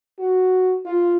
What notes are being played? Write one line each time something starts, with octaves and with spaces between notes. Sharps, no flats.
F#4
F4